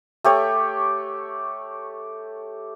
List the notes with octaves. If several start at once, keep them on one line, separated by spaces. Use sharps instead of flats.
A3 G4 C#5